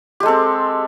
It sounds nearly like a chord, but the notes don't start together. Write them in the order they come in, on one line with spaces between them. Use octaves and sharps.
G4 G#3 A4 C4